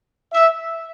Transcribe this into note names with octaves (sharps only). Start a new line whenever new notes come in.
E5